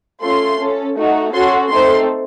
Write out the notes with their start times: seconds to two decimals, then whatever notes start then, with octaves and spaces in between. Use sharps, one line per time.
0.21 A3 C#4 F4 A4 C6
0.58 C#4 A4
0.96 A3 D#4 F#4
1.33 C#4 F#4 A4 C6
1.70 A3 C4 D#4 A4 C6